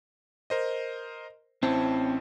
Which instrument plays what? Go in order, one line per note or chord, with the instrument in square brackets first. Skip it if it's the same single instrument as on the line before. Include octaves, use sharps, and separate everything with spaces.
[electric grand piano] A#4 C5 D#5
[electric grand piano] A1 E4 C5 [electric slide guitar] C4 C#4 A5